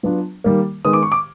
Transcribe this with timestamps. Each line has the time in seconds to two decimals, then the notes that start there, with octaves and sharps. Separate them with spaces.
0.03 F#3 B3 D4 F4
0.44 D#3 G3 A#3
0.84 D#3 G#3 B3 D#6
0.93 D6
1.03 C#6
1.12 D6